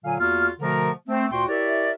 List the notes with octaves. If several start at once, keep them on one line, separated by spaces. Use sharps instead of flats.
A#2 D3 F#3 F5 G#5
E2 A#3 F4 F#4 F6
B2 D3 F3 A3 A#4
A3 C4
D2 A#2 F#4 G5 C6
E4 G4 A#4 C#5 D5 E5